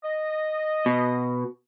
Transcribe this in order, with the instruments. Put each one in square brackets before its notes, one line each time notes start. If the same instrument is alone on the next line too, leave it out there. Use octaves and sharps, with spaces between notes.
[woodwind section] D#5
[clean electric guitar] B2